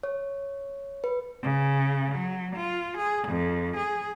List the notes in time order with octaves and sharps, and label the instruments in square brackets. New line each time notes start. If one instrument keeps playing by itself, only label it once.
[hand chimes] C#5
B4
[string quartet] C#3
F#3
F4
G#4
F2
G#4